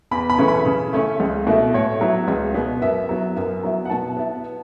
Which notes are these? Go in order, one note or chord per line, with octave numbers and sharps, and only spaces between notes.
E2 B5
B5
C#3 E3 A3 C#4
B5
C#3
A3 C#4 E4
C#2
B2 A3 E4
A2 C#5
F#3 B3 E4
C#2
B2 B3
F#2 E5
F#3 B3 E4
F#2
F#3 B3 E4
F#5
B2 A5
B3 E4